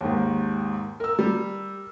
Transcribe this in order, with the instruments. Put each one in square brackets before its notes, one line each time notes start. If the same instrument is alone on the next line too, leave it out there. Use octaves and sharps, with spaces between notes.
[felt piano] D#2 G#2 D#3
A#4 E6
[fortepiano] G3